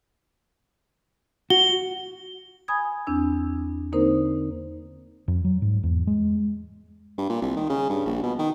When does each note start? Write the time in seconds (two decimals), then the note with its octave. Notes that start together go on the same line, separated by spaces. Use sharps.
1.50 F#4 G7
2.68 G#5 B5 D#6 G#6
3.07 E2 C4 D4 E6
3.92 D3 A#3 C4 D#4 A#4 C5
5.28 F2
5.44 F#3
5.62 G#2
5.83 E2
6.07 G#3
7.18 G2
7.30 A#2
7.42 C2
7.57 D#3
7.69 C#3
7.90 G2
8.06 A#1
8.23 B2
8.39 D#3